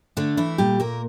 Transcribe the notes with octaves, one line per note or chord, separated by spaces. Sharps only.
D3 A3 D4
E3 E4
A#2 G3 G4
A#3 A#4